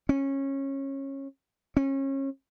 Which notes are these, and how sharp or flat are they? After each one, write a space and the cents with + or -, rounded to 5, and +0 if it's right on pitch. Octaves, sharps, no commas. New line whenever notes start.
C#4 -20
C#4 -30